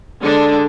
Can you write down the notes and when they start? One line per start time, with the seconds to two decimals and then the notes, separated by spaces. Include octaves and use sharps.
0.21 D3 G#3 D4